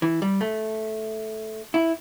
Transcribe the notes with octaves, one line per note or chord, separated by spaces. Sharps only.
E3
G3
A3
E4